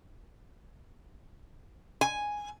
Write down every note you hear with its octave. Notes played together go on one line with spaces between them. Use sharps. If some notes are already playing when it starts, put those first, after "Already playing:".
G#5